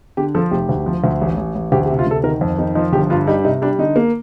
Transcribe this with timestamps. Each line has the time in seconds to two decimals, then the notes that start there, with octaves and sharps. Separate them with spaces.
0.17 D3 G4
0.35 F3 A4
0.51 F1 G4
0.69 D2
0.86 F3
1.04 D2
1.21 A1
1.37 A1
1.55 A1
1.72 D2 G4
1.86 G4
1.90 C3
1.99 F4
2.06 D2 A4
2.23 D#3 A#4
2.41 F2
2.58 D#3 D#4
2.75 F3 D#4
2.93 G1 G4
3.10 G2 F4
3.27 G3 D#4
3.44 C3 D#4
3.62 G3 D4
3.79 D3 D#4
3.96 A#3